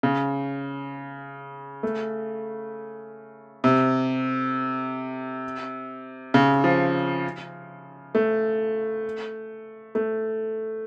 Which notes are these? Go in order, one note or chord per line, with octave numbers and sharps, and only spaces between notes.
C#3
A3
C3
C#3
F3
A3
A3